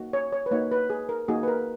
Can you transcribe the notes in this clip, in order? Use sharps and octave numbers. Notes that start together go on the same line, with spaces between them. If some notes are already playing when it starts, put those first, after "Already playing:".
Already playing: A#3 D#4 F#4
C#5
C#5
B4
A#3 D#4 F#4 C#5
B4
G#4
A#4
A#3 D#4 F#4 G#4
B4
A#4